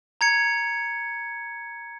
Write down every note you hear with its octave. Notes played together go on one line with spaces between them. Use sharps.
A#5 G#6 C#7